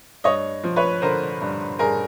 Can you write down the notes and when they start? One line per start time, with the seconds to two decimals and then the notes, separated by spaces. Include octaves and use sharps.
0.24 G2 C#5 D#5
0.63 F3
0.76 B4 C#5
1.02 D3 A#4 C5
1.41 G2
1.79 G2 G#4 A#4